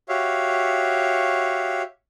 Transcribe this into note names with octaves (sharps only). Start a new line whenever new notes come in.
F#4 G4 C#5 E5 F5